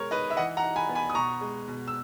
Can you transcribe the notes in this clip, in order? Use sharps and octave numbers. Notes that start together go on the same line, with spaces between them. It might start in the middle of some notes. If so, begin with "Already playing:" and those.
Already playing: B2 G#3 A#4 C#5
D#4 B4 D#5
E5
E3 D#5 F#5
F#5 A#5
D#4
G#5 B5
B3
G#5 B5
D#6
B2 A#5 C#6
G#3
B2
E6